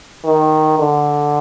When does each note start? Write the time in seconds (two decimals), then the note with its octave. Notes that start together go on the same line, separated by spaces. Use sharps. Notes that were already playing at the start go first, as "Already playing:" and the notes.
0.24 D#3
0.79 D3